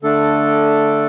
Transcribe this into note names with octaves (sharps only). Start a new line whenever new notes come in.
D3 A3 D4 A4